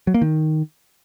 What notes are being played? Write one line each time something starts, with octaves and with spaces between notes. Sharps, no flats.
F#3
A#3
D#3